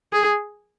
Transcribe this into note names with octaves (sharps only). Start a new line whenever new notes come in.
G#4